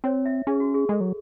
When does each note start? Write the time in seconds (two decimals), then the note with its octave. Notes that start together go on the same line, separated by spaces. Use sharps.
0.04 C4 C#5
0.25 E5
0.47 C#4 G#4
0.60 F#4
0.74 G#4
0.89 G#3 A4
1.01 F#3